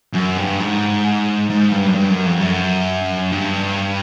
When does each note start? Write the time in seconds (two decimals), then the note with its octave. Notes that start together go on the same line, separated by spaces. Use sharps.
0.14 F#2
0.37 G2
0.60 G#2
1.50 G#2
1.72 G2
1.87 F#2
1.96 G2
2.10 F#2
2.26 F2
2.40 F#2
3.32 G2